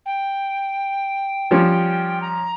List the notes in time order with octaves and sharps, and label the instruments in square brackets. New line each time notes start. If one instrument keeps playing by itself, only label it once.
[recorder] G5
[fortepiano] F3 G3 C#4
[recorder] A#5